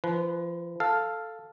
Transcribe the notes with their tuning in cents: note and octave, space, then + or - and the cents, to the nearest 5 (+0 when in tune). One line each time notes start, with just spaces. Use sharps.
F3 -30 B4 +0
A4 +0 F5 +0